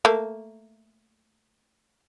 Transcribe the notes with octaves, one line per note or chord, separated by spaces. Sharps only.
A3 A#3